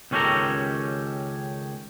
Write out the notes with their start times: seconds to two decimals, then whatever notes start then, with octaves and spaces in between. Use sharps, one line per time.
0.11 C#2 D#3 C#4 G4 A4 A#5